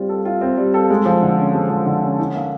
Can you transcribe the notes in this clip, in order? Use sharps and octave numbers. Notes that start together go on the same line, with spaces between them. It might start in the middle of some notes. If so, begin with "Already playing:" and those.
Already playing: G3 C4 F4
A4
F4
C4
G3
A4
G#3
F3
D3
C#4
G#3
F3
D3
C#4
D#4
A#3